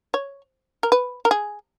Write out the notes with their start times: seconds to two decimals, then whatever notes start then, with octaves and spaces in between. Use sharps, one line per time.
0.14 C#5
0.83 A#4
0.92 B4
1.25 A#4
1.31 G#4